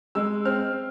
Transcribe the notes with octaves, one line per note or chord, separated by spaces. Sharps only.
G#3 E6
C4 F6